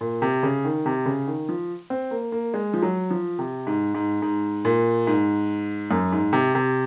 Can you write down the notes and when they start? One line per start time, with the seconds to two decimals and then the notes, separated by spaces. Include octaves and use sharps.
0.01 A#2
0.22 C3
0.43 C#3
0.65 D#3
0.86 C3
1.06 C#3
1.27 D#3
1.49 F3
1.90 C4
2.11 A#3
2.32 A#3
2.54 G#3
2.74 F3
2.82 F#3
3.11 F3
3.39 C3
3.67 G#2
3.95 G#2
4.22 G#2
4.65 A#2
5.07 G#2
5.91 F#2
6.12 G#2
6.33 C3
6.55 C3